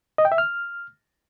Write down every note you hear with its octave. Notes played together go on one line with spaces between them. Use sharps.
D#5
G5
E5
F6